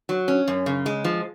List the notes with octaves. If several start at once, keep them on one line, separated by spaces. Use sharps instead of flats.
F#3
C#4
F#2
C#3
G#3
F3